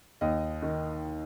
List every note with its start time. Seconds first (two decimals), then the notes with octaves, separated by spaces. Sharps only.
0.21 D#2 D#5
0.62 D#3